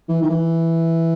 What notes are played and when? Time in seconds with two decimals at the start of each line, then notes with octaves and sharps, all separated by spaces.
0.09 E3
0.22 D#3
0.30 E3